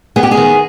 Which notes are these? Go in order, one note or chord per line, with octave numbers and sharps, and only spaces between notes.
B3 G#4
G4
G#4
D#3